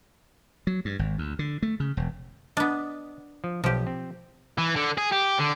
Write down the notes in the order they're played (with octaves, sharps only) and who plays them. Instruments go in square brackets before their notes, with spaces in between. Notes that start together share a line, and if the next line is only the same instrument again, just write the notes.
[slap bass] F#3
G2
G#1
D2
D3
A3
C#3
E1
[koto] B3 D4 [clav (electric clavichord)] D#5
[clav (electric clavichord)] F3
[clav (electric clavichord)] B1 [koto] F3 G4
[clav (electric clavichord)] C4
[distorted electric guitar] E3
D3
G#4
G4
D3